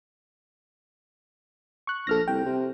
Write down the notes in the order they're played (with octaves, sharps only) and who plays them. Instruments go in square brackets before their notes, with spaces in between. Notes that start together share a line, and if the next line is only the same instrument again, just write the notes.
[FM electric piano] C#6 F#6
[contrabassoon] A#1 [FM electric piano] A4 F6 A#6
[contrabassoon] C2 [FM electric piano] G5
[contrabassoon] C3